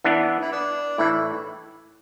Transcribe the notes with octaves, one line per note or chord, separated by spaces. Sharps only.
E3 B3 D4
E4
B3 D4
A2 E3 E4